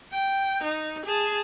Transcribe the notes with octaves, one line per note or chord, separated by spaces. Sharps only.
G5
D#4
G#4 A5